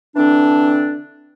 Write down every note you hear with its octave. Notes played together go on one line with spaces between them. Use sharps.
D3 E3 C4 D4